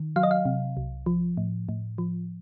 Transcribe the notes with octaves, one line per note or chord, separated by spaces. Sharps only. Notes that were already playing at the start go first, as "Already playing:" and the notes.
Already playing: D#3
F#3 F5
D#5
F5
C3
C2
F3
A2
A2
F3